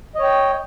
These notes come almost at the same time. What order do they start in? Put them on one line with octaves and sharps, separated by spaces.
D#5 C#5 G5